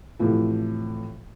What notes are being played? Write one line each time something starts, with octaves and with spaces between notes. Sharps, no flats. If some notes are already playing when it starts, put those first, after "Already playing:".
A2 C3 E3 F3